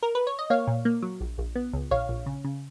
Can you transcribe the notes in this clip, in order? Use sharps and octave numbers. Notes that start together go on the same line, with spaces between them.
A#4
B4
C#5
D#5
A#3 C#5 F5
A#2
A#3
F#3
A#1
A#1
B3
C#2
A#1 C#5 F5
A#1
C#3
C#3